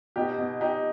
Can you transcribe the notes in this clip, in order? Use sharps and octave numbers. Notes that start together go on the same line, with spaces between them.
B2 D#4 G4
B2
B2 D#4 G4